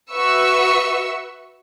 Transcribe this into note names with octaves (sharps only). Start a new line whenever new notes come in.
F#4 B4 E5 C#6 E6